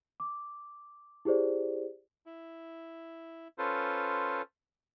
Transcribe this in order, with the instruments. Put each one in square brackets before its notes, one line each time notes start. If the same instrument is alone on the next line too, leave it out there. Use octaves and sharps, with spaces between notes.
[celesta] D6
E4 G4 G#4 C5 D5
[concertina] E4
C#4 F4 A4 B4 C5